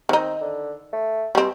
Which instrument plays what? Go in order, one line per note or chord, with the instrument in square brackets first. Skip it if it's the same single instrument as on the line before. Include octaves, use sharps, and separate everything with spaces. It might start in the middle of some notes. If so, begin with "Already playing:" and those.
[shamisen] D#3 D#4 [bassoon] C4
[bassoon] D3
A3
[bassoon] B2 [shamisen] G3 C4